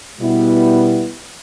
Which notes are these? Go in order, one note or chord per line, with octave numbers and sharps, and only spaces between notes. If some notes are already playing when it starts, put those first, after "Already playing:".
B2 G3 B3 E4